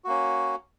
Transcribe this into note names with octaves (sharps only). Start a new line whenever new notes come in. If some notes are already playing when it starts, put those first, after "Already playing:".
A#3 C#4 F#4